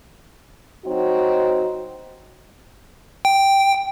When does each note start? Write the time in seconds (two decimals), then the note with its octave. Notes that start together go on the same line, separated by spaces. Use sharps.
0.85 F#3 C4 D#4 F#4
3.25 G5